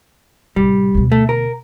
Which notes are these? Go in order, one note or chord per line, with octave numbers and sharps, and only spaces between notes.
A1 C3 G3
D2 B2
A3
A#4